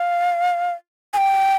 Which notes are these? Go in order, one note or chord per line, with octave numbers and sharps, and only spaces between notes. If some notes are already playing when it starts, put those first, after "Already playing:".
Already playing: F5
G#5
G5